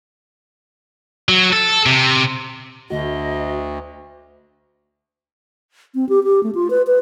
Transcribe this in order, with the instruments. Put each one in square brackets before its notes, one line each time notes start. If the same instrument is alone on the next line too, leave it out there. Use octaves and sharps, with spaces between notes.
[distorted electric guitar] F#3
A4
C3
[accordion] D2 [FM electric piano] D3 A3 F#4 [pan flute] D#5
[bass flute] C4
G4
G4
A3
F4
B4
B4